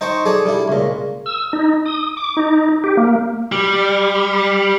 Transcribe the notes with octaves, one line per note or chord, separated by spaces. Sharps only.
D#4 C5 G5 A5 C#6
G#4 A4 D5 A5
G3 D4 E4
C#2 A#2
E6
D#4
D#6
D6
D#4
G4
A#3
G3